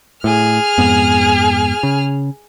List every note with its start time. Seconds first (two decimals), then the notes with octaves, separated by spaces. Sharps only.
0.24 A2 G#4 F6
0.78 F2 G#2 B3
1.83 C#3